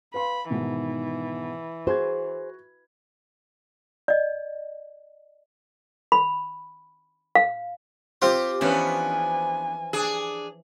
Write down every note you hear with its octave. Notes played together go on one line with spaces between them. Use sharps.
B4 F5 B5 C6
G#2 B2 D#3 E3
F#4 G#4 C5 G#6
D5 D#5
B5
F5
C4 F4 G4 C5
E3 F3 B3 C#4 D4 G#5
D4 G#4